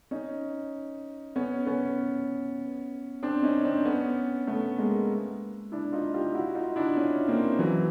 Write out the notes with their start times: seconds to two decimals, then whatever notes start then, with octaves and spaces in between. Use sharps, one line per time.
0.11 C#4 D#4
1.36 B3 C#4
1.66 B3 C#4
3.23 C4 D4
3.43 C#4 D#4
3.65 C4 D4
3.85 B3 C#4
4.47 A3 B3
4.78 G#3 A#3
5.72 D4 E4
5.92 D#4 F4
6.14 F4 G4
6.35 E4 F#4
6.55 D#4 F4
6.76 D4 E4
6.97 C#4 D#4
7.28 A#3 C4
7.59 E3 F#3